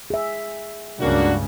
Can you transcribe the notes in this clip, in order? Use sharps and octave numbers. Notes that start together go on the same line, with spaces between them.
G#4 E5
C#2 G2 C#3 A#3 D4 F#4